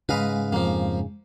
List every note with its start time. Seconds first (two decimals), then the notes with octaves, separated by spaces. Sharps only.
0.09 G#2 C#3 G#3 B4 D#5 F5
0.52 F2 F3 A#3